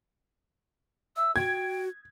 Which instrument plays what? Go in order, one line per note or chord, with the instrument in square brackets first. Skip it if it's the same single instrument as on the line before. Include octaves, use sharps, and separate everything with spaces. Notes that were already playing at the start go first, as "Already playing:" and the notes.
[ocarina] E5 [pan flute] E6
[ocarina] F#4 [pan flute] G5 [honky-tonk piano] G#6